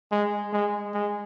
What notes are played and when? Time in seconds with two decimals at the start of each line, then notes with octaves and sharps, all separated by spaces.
0.12 G#3
0.53 G#3
0.94 G#3